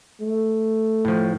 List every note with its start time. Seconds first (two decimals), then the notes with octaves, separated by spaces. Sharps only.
0.21 A3
1.05 A2 F3